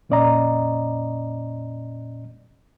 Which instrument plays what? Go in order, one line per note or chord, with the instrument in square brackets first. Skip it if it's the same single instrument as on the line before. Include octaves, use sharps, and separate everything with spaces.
[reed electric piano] F2 A#2 C#4 D5 D#5 A#5